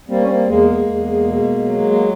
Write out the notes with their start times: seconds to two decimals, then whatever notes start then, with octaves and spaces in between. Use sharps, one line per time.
0.08 G3 A#3 C4
0.21 C#4
0.28 A#3 C4
0.47 E2 G#3 A#3
0.86 E2
1.24 B2
1.63 F#3
1.90 A#3